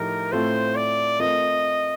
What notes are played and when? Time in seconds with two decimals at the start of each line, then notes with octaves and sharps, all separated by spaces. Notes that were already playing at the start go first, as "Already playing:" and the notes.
Already playing: A2 F3 A3 D#4 G4 A#4
0.32 A2 A3 C4 F4 A4 C5
0.76 D5
1.19 A3 C4 F4 A#4 D#5